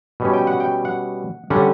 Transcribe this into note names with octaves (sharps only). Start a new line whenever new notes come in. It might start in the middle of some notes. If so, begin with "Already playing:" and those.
B2 G3 C#4
G5
F#5
G5
F#5
D3 G3 C#4 F#5